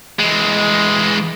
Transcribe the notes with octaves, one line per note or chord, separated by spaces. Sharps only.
E3 G#3